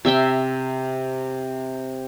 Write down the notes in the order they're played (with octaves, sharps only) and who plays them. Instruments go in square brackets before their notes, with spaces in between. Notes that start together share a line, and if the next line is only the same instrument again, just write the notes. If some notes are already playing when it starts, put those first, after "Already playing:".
[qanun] C3 E5 G5 C6